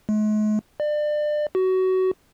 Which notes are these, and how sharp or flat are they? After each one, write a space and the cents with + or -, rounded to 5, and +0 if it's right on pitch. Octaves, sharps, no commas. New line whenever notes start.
G#3 +45
D5 +30
F#4 +20